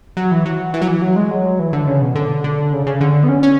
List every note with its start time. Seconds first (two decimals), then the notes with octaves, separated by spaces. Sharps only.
0.17 F#3
0.31 E3
0.46 F#3
0.74 E3
0.82 F#3
0.88 E3
1.02 F#3
1.16 G#3
1.31 F#3
1.59 E3
1.73 D3
1.87 C#3
2.02 B2
2.15 D3
2.44 D3
2.73 C#3
2.86 C#3
3.01 D3
3.24 B3
3.29 C#4
3.43 C#4